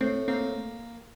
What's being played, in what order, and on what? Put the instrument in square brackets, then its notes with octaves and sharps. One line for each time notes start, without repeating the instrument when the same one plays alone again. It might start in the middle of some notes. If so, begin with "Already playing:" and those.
[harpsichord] A2 [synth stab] C4
[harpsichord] A#3 [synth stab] C4